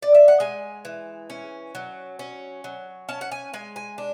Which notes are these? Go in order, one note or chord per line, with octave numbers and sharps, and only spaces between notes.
D5
E5
F#5
G#3 G#5
E3
C#4
F#3
C#4
F#3
C#4 A5
F#5
G#5
G#3 G#5
G#5
D4